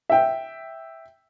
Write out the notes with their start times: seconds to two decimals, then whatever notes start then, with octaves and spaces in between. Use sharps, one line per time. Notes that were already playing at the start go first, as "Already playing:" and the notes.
0.09 E5 G5